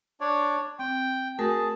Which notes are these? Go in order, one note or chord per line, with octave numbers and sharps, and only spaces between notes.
D4 C#5 D5
C4 G5
A3 F#4 G#4 A#4 A5